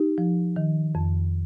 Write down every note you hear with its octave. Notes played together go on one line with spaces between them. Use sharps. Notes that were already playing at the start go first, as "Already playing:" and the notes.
Already playing: D#4 G4
F3
D#3
F2